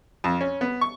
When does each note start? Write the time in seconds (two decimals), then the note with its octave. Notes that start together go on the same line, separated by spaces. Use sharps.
0.24 F2
0.41 C#4
0.61 B3
0.81 C#6